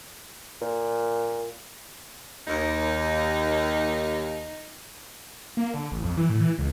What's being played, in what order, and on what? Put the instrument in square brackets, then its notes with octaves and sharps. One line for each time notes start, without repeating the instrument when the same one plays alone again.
[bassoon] A#2
[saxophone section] D#2 [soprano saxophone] D#4
[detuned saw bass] A#3
D3
A1
F2
E3
A2
E3
C#2